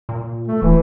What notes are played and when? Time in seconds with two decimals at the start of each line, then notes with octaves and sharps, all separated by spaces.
0.09 A#2
0.48 A3
0.62 D1 E3